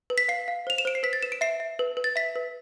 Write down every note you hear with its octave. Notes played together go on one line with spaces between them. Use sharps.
B4
B6
F5 C7
F5
C5 F7
E7
C5 D7
C7
B4 B6
A6
B4 E7
D7
E5 C7
E5
B4
B4
A6
E5 B6
B4